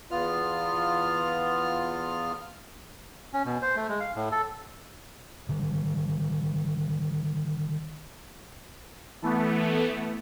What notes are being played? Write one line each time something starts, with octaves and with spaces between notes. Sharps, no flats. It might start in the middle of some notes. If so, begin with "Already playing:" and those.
E2 B3 F4 F6
C#4
B2
C5
A3
G#3
F5
A2
A4
D3 D#3 G3
E3 A3 B3